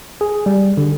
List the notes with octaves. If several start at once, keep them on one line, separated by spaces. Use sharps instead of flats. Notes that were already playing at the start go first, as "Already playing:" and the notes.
G#4
G3
D3